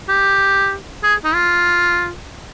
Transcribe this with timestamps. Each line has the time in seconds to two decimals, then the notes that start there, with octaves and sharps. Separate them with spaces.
0.09 G4
1.03 G#4
1.24 D#4
1.34 F4